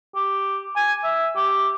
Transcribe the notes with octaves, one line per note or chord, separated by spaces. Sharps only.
G4
G#5
E5
G4